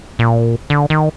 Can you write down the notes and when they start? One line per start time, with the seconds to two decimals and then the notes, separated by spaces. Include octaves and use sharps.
0.19 A#2
0.70 D3
0.90 D#3